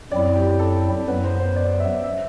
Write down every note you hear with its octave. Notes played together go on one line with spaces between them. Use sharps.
F#2 F#3 C4 E4 D5
G4
A4
F#2 F#3 B3 B4
C5
C5
D5
E5
E5